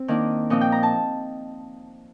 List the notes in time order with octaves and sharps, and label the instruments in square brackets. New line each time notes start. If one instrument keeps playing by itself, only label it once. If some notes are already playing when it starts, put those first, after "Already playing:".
Already playing: [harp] C4
D#3 A#3 D4
A#2 F3 C4 D#5
G5
A#5
A5